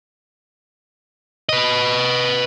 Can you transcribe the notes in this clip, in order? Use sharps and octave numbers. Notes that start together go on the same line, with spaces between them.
B4 D#5